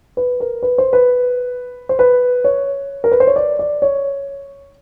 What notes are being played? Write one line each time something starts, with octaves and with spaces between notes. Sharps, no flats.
B4
A#4
B4
C5
B4
C5
B4
C#5
A#4
B4
C5
C#5
D5
D5
C#5